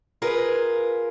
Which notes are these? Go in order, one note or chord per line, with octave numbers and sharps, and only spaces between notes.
F4 G#4 A#4 B4